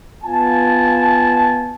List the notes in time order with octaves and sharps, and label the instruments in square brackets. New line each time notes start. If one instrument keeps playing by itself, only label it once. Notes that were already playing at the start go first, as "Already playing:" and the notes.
[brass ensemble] B3 F4 G#5 A5